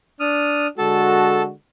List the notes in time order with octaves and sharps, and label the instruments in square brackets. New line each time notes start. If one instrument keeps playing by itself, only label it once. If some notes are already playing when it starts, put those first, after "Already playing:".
[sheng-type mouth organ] D4 D#6 F6
[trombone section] D3 G#3 F#4 [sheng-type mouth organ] A4 A5